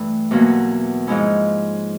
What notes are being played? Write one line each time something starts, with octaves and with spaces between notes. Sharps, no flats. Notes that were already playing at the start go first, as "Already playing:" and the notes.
Already playing: G2 E3 A3
E2 B2 F#3 A#3
G#2 F3 G#3 C#4 E4